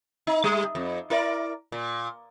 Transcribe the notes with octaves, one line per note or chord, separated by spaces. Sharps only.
D#4
G3
F2
E4 A#4 D5
A#2